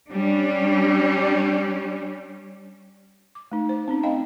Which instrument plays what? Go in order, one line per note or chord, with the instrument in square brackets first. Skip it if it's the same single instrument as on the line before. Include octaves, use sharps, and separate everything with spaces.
[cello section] G3 C#4 D4
[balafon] D6
A3 D#4
C5
C4 C#4 D#4
C4 D#5 F5 G5 B5